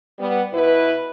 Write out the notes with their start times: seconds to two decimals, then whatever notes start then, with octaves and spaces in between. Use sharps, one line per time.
0.19 G3 B3
0.53 B2 E4 B4